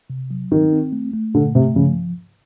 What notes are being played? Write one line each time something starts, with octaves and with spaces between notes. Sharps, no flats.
C3
F#3
D#3 C4
C4
A3
A3
A#2 D3
C3 A3
C#3 F3